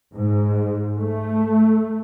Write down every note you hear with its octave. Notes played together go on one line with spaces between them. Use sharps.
G#2
A3